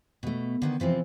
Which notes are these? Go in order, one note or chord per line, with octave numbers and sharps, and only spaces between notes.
B2 A3
D3 D#3 B3
C3 E3 F3 C4